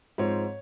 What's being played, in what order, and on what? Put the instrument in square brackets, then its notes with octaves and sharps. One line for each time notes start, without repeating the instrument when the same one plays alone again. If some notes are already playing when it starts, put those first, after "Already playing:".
[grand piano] G#2 F3 C4 C#5